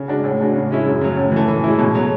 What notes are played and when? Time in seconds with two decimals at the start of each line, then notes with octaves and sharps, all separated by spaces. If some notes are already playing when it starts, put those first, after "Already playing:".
Already playing: C#3
0.08 G#3 D4 F#4
0.24 A2
0.39 G#3 D4 F#4
0.54 C#3
0.71 G#3 C#4 E4
0.86 F#2
1.01 C#3 F#3
1.16 A2
1.32 E3 A3
1.48 E3
1.64 G#3 C#4 E4
1.78 B2
1.95 F#3 A3